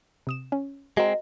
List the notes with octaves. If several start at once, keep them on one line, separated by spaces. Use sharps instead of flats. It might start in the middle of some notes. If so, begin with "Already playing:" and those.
C3 D#6 E7
C#4
G#3 C4 F#4 A#4 D#5